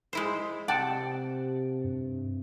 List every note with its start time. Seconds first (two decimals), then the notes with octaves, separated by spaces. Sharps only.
0.13 G#3 E4 C5
0.68 C3 D5 F#5 G5 A5
1.84 G2